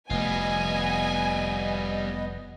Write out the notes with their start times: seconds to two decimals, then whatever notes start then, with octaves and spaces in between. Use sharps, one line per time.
0.10 F1 G3 A3 B3 F4 D#5 G#5